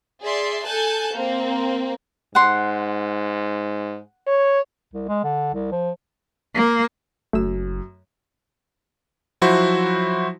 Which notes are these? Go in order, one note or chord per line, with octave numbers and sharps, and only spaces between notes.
G#4 D5 E5 C6
A4 G#5 A5 F#6 G6
A#3 C4
G#2 F#5 C6
C#5
C2
G#3
D3
C2
F3
A#3
F#1 F#2 A3 E6
F3 F#3 E4 F#4 C5